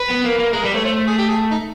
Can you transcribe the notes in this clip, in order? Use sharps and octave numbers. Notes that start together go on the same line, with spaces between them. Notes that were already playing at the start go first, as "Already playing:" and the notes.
Already playing: B4
B3
A#3
A#3
G#3 A#4
G3 B4
A3 C#5
A3 C5
C5
G#4
G4
G#4
D#4